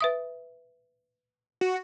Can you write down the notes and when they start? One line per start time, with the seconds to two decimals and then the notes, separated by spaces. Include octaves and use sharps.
0.01 B4 E5 D#6
1.61 F#4